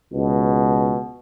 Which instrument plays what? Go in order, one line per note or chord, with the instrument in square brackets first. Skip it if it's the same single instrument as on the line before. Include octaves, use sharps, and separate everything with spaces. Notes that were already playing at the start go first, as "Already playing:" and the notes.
[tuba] C#2 [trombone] B2